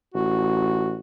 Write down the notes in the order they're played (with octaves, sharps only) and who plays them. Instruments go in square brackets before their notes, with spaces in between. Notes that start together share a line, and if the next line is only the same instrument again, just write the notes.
[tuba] A1 [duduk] F#4